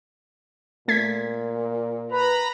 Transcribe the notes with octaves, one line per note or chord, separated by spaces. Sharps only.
A#2 A3 G#6 B6
B4 A#5 B5